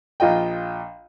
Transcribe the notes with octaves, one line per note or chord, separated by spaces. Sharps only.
A#1 F4 D#5 G5